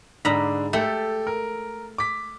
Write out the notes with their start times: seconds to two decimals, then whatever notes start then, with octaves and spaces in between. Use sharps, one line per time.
0.25 G#2 D3 D4 A#5 B5
0.73 A3 G4 A4
1.27 A#4
1.98 D6 B6